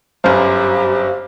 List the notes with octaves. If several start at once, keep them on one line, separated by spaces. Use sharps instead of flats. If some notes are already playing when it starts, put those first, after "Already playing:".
G1 F#2 G4 C5 F5